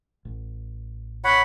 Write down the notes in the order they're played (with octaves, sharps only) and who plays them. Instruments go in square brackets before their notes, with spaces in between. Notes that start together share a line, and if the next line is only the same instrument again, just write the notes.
[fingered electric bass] A1
[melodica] C#5 F#5 B5